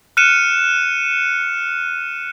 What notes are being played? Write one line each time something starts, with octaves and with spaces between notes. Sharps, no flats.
F6 F#6 C#7 D#7 E7